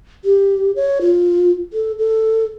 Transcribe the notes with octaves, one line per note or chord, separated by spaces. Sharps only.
G4
C#5
F4
A4
A4